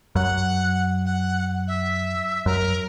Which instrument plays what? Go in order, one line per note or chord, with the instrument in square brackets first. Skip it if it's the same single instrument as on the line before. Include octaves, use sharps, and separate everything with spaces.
[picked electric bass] F#2 [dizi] F#5
[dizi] F#5
E5
[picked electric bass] F#2 [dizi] A#4